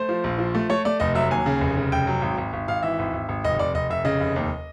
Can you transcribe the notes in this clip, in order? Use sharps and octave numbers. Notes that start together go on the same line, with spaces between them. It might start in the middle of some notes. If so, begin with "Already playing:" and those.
Already playing: A3 C5
F3
A#1
F3
A3
A3 C#5
A3 D5
F1 D#5
F#3 E5
D#2 G#5
C#3
F1
C#3
F1 G5
F#3
G#1
G#1
G#1
G#1 F5
E3 E5
G#1
G#1
G#1
F1 D#5
F1 D5
F1 D#5
F1 E5
C#3 D#5
F1
D#2